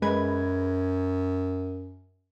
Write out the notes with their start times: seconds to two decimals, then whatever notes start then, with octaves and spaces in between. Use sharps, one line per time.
0.02 F#2 G#3 B4 G#6